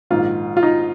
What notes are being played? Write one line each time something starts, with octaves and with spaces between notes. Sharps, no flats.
A#1 G#2 D#3 F4
F4
D#4